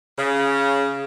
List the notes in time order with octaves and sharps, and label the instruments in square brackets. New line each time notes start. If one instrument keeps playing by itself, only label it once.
[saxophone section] C#3